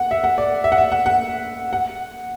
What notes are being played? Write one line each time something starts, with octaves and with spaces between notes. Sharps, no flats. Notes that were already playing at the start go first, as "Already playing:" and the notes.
Already playing: F#5
E5
F#5
D5
E5
F#5
E5
F#5
F#5
F#5